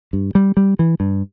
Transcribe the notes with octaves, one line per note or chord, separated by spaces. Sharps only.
G2
G3
G3
E3
G2